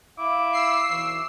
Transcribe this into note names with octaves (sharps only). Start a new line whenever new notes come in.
E4 F5 D6
E6 C7
B1 E3 C#5